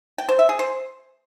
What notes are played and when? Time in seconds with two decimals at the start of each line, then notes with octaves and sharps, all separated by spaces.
0.18 G5
0.29 C5
0.39 E5
0.49 G#4
0.59 C5